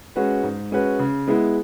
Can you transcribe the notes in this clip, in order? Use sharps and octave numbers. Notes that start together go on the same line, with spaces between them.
G#3 C#4 F#4 B4
G#2
G#3 C#4 F#4 B4
C#3
G#3 B3 E4